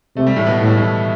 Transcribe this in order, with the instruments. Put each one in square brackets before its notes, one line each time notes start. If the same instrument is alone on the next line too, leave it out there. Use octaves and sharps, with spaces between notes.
[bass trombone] C3 [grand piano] A3
[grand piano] G3
A2 A3
B2 B3
[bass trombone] A2 [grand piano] G3
[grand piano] A2 A3